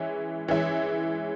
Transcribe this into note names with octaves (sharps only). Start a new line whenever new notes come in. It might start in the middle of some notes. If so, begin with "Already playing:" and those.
Already playing: E3 G#3 C#4 E4
E3 G#3 C#4 E4